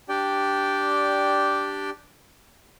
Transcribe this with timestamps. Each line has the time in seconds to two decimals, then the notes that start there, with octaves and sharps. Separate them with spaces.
0.09 D4 G4 D5 G5